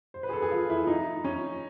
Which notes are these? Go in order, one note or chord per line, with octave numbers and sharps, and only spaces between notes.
C5
B4
G#4
A4
G#4
F4
E4
D#4
C#4